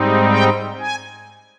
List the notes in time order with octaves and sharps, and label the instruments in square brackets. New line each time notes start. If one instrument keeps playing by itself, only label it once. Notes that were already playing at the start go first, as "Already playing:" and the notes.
Already playing: [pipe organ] G#2 G3 C4 D#4
G5
G#5